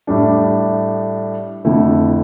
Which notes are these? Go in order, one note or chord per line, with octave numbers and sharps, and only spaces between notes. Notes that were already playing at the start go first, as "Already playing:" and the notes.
A2 G3 D4
F2 D3 A3 E4